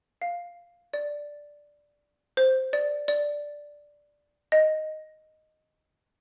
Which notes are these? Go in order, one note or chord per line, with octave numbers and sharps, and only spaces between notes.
F5
D5
C5
D5
D5
D#5